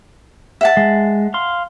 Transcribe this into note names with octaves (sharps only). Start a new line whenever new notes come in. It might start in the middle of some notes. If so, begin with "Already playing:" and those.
E5 F#5 A5
G#3
F5 C6